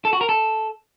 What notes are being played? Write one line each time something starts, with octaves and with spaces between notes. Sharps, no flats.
A4
F#4
A#4
A4